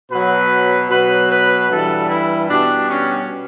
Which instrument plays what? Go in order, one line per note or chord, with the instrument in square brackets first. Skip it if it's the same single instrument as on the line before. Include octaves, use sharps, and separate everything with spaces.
[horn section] B2 F#3 B4
B2 F#3 B4
B4
G2 E3 G3 A4
E4
B2 G3 D4
C#4